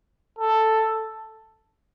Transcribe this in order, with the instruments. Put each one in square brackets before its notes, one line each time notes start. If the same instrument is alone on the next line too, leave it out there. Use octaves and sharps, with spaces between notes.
[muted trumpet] A4